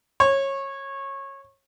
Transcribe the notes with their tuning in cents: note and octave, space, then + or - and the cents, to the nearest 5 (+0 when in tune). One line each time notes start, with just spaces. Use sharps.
C#5 -20